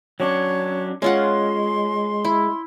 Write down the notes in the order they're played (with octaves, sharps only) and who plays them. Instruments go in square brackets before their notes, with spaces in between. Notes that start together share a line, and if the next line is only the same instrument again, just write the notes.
[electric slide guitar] F#3 C#4 D4 [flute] C#5
[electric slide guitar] G#3 [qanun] C#4 F4 F#5 [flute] C6
[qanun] E4